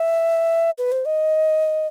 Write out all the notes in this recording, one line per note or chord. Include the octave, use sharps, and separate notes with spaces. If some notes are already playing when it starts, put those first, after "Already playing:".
Already playing: E5
B4
C5
D#5